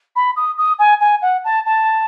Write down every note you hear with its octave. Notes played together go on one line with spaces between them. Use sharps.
B5
D#6
D#6
G#5
G#5
F#5
A5
A5